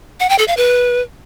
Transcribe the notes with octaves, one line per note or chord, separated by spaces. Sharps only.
F#5
G5
A4
F5
B4